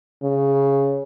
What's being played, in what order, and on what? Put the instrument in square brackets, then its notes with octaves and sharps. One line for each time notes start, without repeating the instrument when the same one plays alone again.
[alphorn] C#3